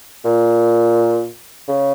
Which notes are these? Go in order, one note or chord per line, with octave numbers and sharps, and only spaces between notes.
A#2
C#3